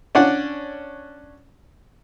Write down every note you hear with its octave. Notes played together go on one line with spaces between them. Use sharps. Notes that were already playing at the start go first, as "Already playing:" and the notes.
C#4 D4 D5 F#5